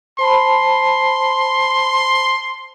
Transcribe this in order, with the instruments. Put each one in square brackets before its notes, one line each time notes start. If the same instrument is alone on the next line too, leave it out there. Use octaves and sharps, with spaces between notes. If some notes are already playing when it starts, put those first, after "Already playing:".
[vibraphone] C5 A5 B5 [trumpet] C6